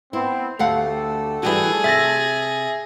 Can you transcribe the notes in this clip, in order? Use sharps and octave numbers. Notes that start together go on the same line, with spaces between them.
B3 C4 E4
D2 A3 G4 A4 F5 F#5
E3 G3 F#4 G#4
C3 E5 A6 A#6